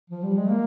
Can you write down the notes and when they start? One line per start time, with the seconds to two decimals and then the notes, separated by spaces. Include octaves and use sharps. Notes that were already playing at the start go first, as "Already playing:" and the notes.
0.10 F3
0.23 G3
0.37 G#3
0.50 A#3